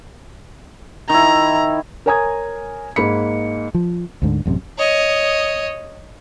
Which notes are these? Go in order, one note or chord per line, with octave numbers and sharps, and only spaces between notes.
D#3 E4 A#5
A#4 C#5 G#5 A#5 D#6 G#6
G#2 A#3 B5 C#7
F3
D2 G#2 D3
A1 F#2 C3
C#5 D#5